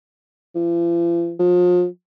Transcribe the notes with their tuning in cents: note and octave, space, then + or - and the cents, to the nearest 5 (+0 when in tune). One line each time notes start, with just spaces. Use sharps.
F3 -45
F3 +35